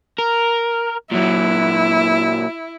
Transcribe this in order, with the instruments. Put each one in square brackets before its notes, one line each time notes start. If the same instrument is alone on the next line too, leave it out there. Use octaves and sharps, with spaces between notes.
[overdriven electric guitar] A#4
[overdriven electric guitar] A#2 F#3 [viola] E4